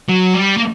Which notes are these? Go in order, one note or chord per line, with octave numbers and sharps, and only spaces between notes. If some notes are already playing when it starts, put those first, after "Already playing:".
F#3
G3
A#3